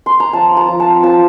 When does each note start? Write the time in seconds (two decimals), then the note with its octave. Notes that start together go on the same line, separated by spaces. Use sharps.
0.06 C6
0.20 A#5
0.33 F3 A5
0.51 F4
0.57 A#5
0.68 F3
0.80 A5
0.85 C4
1.03 F3 A5